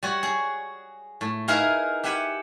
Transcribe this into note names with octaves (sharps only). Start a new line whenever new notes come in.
G3 F#4 C#5
G#4
A2
D#4 E4 G#4 A#4 B4 F5
G4 E5 F#5 G#5 B5